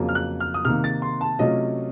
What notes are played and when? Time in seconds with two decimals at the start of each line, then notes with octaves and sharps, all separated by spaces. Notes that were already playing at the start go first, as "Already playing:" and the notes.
Already playing: F2 C#3 F#3 A#3
0.09 F6
0.15 F#6
0.40 F6
0.54 D#6
0.65 C3 D#3 A#3 F6
0.84 A6
1.02 C6
1.21 A5
1.39 C3 F#3 A3 C#4 F4 D#5